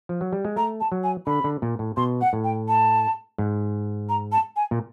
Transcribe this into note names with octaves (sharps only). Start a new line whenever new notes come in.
F3
F#3
G3
G#3
A3 A#5
A5
F#3
G#5
D3 B5
D3
A#2
A2
B2 C6
F#5
A2
G5
A5
G#2
A#5
A5
G#5
A#2